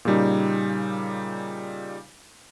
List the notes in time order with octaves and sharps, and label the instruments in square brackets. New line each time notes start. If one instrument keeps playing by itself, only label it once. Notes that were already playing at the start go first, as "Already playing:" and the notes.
[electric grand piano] A#2 C#3 G3 D#4